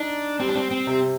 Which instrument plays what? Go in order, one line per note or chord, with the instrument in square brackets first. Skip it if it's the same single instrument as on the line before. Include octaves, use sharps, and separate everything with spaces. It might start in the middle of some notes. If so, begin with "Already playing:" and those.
Already playing: [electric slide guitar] D4 [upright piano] D#4
[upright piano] G3 [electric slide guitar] C4
[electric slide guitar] D4
C4
C4
[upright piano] C3